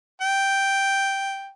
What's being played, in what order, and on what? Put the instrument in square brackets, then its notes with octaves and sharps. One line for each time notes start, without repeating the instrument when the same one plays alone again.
[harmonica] G5